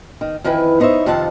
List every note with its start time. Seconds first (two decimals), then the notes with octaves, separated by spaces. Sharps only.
0.21 D#3
0.44 F2 D#3 E3 E4 B4
0.80 B3 D#4 C5 C#5 E5
1.06 F2 C3 D#3 F4 F#5 A5